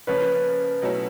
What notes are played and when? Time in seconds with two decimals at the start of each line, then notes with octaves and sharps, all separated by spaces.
0.07 C#3 F3 A#3 B4 C#5
0.82 B2 F#3 A3 C#4 E4